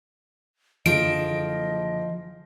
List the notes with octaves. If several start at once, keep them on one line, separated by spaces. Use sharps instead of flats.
F#1 D3 F3 D#5 D7